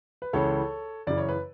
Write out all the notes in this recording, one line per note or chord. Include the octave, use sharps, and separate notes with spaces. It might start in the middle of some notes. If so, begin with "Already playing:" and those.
B4
C#2 C#3 E3 A4 C#5
F#2 C#3 E3 D5
C#5
B4